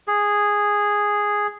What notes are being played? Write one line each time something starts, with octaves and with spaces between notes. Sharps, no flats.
G#4